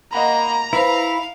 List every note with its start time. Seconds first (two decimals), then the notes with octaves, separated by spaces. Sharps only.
0.13 A#3 D#5 F#5 A#5 B5
0.73 E4 B4 C5 F5 B5